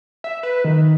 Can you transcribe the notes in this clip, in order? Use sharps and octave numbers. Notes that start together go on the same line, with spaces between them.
E5
B4
D#3